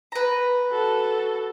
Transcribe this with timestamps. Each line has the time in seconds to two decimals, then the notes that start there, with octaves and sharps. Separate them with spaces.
0.12 B4 A#5
0.70 F#4 A4